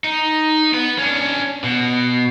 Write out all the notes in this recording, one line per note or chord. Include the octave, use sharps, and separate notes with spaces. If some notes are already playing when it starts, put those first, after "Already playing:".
D#4
B3 B4
C#4 D4
B2